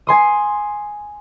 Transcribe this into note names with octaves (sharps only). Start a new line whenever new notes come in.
G#5 C6 D#6